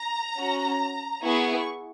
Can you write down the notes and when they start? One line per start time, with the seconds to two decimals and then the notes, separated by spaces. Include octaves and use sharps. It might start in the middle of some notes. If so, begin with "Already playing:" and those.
Already playing: A#5
0.35 C#4 F#4
1.22 B3 E4 G#4 C#6